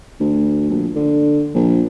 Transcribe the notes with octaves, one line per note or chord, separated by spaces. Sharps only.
D2
A#1
D3
A#1